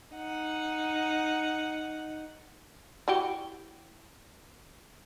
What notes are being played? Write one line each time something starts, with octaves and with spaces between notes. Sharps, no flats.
D#4 F#5
E3 F#4 G4